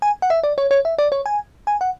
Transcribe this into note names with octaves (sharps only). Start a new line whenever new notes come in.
G#5
F#5
E5
D5
C#5
C#5
E5
D5
C#5
G#5
G#5
F#5